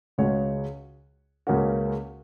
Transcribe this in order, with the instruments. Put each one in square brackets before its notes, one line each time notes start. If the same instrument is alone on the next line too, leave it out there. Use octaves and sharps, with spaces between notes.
[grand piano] C#2 C#3 G#3 F#4 C#5
C#2 C#3 A#3 C#4 F#4